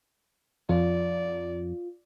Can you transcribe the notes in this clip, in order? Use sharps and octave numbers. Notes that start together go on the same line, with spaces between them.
F2 F4 D5